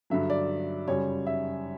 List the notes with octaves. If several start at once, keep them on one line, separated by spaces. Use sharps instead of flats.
G2 D3 F#3 E5
D5
F#2 C#3 G3 C#5
E5